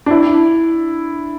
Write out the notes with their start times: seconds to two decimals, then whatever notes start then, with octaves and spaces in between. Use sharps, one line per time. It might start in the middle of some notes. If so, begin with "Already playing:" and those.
0.06 D4
0.11 E4